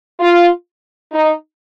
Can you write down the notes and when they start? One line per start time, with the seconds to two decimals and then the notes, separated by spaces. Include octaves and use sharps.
0.20 F4
1.13 D#4